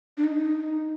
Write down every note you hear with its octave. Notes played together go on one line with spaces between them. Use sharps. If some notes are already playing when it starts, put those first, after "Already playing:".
D4
D#4